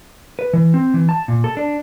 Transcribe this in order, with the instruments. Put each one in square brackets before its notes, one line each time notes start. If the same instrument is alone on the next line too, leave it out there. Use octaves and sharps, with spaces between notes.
[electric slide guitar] B4
E3
C4
E3
A5
A#2
A4
D4